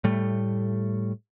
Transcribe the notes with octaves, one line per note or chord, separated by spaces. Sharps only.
A2 G3 A3